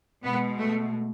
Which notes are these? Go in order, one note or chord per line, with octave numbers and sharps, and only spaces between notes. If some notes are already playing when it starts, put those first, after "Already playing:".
B2 G#3 B3
A3